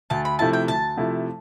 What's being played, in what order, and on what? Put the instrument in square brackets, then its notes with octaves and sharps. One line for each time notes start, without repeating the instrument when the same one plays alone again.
[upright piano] D2 [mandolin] A5
[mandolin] B5
[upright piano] C3 F3 A3 E4 [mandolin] A5
[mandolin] G5
[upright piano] D2 [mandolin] A5
[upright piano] C3 F3 A3 E4